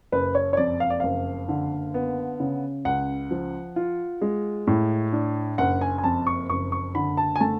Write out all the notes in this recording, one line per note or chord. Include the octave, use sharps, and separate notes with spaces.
F#1 B4
C#5
C#5
F2 D5
F5
D5
F#1 F5
D3
B3
C#3
C#2 F#5
F3
F4
G#3
A2
D4
F#1 F#5
G#5
G#5
F2 A5
C#6
F#1 C#6
C#6
D3 B5
A5
G#5
A3 A5